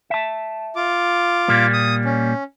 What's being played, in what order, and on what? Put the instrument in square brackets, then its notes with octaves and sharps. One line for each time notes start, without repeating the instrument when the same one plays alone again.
[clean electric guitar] E5 A5
[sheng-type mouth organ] F4 D6
[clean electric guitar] A#2 G3 A#3
[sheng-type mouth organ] D#6
C#4